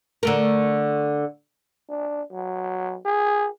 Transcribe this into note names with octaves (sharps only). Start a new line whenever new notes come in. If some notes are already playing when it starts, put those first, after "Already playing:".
D3 A3 A#4
D4
F#3
G#4